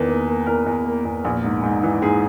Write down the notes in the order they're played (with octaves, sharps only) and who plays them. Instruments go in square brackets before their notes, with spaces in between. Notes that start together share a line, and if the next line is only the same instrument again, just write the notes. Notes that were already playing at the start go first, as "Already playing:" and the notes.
Already playing: [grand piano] E2 D#3 B4
A#3
A#3
E2 A#4
E2
A#3
E2
A#1
G#2
G#2
E3
G#2 G#4